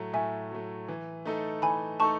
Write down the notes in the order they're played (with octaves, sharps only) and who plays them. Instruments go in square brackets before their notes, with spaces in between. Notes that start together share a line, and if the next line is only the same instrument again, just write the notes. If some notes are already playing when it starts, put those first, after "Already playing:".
Already playing: [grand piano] A2 F#3 A3
[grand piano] A2 [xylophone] E5 G#5
[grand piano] F#3 A3
E3
A3 D#4 A4
[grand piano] E3 [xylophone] G#5 B5
[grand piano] A3 D#4 A4 [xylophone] A5 C#6